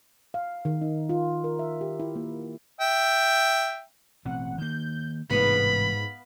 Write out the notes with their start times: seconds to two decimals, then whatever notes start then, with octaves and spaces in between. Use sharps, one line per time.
0.34 F5
0.65 D#3
0.81 D#4
1.09 F4
1.44 A#4
1.59 E5
1.81 G4
2.00 E4
2.16 A#3
2.80 E5 G5
4.25 A1 B2 C4 F#5
4.58 D#3 A#3 G6
5.30 A1 G#2 C3 A3 B3 D#5 F5 B5